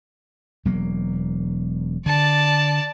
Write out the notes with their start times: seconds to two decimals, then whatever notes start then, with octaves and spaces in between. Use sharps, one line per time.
0.65 E1 F#3 A#3
2.06 D3 D5 A5